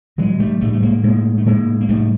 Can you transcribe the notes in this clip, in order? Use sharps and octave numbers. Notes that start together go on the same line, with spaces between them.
A2 F#3 G#3
G3 A3
A2 G3 A3
A3
G#3 A#3
A2 G#3 A#3
A3
A2 G#3 A#3
A#3
A2 G3 A3